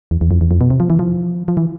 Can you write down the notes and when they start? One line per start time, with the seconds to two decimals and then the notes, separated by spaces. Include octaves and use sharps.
0.11 E2
0.21 E2
0.31 F2
0.41 E2
0.51 F2
0.61 B2
0.70 C3
0.80 F3
0.90 E3
0.99 F3
1.48 F3
1.57 E3